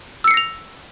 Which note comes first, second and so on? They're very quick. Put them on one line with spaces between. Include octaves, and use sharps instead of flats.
E6 C#7 C7 A#6 F7